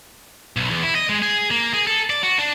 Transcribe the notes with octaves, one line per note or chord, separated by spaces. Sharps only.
B1
E2
E4
D#5
G#3
G#4
A#3
G#4
A4
D5
F#4
D4